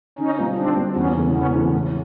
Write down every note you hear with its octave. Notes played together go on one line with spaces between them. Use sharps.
D3 C#4 D#4
G3 C4 F4
D3 C4 D4
G3 C4 F4
E2 B3 C#4
C#3 E3 A3 C4
E2 B3 C#4
C#3 E3 A3 C4
A2